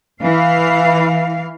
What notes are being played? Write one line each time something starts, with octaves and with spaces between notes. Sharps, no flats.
E3 F5